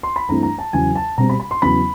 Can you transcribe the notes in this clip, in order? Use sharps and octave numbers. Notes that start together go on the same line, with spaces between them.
C6
B5
G2 E3 A3 C4 A#5
A#5
A5
E2 C#3 F#3 G#5
A5
B2 G3 C4 A#5
B5
B5
C6
E2 C#3 F#3 B3 B5